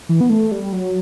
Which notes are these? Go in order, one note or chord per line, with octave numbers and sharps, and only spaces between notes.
E3
B3
A3
G3
F#3